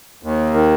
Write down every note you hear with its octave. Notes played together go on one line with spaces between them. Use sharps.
D#2
D#3